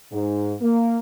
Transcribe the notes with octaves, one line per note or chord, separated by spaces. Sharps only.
G#2
A#3